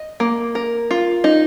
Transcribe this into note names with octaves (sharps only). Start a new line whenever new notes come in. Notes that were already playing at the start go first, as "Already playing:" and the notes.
Already playing: D#5
A#3
A#4
F4
D#4